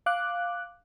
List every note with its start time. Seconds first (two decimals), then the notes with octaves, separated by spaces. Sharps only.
0.06 F5 D6 F#6